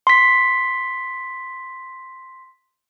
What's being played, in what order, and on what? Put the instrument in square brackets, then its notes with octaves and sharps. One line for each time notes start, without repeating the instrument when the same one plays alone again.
[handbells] C6 B6